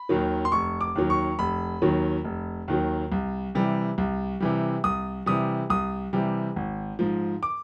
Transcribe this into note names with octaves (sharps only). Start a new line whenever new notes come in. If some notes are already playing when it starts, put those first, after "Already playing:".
Already playing: B5
D#2 D#3 F#3
C6
F1 C#6
D6
D#2 D#3 F#3
C#6
F1 B5
D#2 D#3 F#3
F1
D#2 D#3 F#3
C2
C3 E3 G3
C2
C3 E3 G3
C2 D#6
C3 E3 G3 D#6
C2 D#6
C3 E3 G3
G#1
G#2 F3
D6